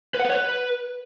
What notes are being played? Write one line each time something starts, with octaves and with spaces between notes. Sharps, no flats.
B4
F#5
B4
C#5
B4